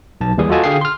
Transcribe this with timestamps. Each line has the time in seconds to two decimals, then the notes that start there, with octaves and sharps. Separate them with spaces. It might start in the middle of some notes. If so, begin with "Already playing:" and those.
0.21 B1 A5
0.38 D#2 E3 G3 G#4 D#6
0.50 F4 F#4 A4 D#5 G#5 A5
0.64 D3 G#4 F5 G5 C7
0.81 C6 F6